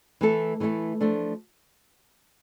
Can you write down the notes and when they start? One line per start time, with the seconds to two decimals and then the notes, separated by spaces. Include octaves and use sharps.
0.21 E3 A3 E4 A4
0.60 E3 A3 E4 A4
1.01 F3 A3 D4